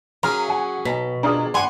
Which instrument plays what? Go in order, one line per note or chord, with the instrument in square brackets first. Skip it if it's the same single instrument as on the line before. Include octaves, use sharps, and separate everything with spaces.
[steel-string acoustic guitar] F#3 C#4 G#4 [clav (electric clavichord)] A#4 F5 A#5
[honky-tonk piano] F#5 [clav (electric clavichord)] G#5
[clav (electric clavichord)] B1 [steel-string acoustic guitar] B2 [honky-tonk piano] B6
[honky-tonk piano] D4 F4 G#4 [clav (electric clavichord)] A#4 D#5
[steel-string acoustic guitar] G2 G#5 [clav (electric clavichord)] D5 [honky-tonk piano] F#5 B5 C6